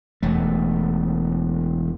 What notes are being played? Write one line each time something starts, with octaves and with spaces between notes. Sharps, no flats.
E1 A3